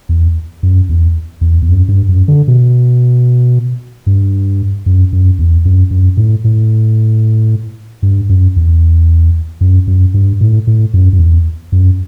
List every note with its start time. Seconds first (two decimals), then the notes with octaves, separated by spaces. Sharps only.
0.09 E2
0.63 F#2
0.89 E2
1.41 E2
1.62 E2
1.69 F#2
1.88 G2
2.08 F#2
2.28 D3
2.48 B2
4.06 G2
4.86 F#2
5.12 F#2
5.39 E2
5.65 F#2
5.91 F#2
6.17 A2
6.44 A2
8.02 G2
8.29 F#2
8.56 E2
9.61 F#2
9.87 F#2
10.14 G2
10.41 A2
10.67 A2
10.94 F#2
11.13 F#2
11.19 E2
11.72 F#2